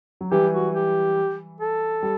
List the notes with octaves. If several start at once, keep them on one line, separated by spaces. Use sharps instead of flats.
F#3
E3 G3 G4
F#4
G4
A4
G3